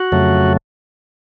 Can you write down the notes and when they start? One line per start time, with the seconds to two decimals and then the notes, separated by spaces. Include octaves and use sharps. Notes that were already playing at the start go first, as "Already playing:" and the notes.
Already playing: F#4
0.12 F2 C#3 F#3 A3